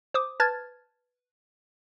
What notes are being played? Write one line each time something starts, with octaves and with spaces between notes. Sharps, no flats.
C5 D6 D#6
B4 A5 F6 G#6 A6